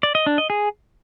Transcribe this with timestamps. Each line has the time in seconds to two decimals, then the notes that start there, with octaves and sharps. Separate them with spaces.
0.03 D5
0.15 D#5
0.26 D4
0.38 D#5
0.50 G#4